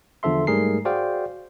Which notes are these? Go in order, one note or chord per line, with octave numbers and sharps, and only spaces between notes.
E2 D3 F3 A4 E5 C6
G#2 G3 A3 G#4 A#4 C7
F#4 G#4 C5 D5 F5 G5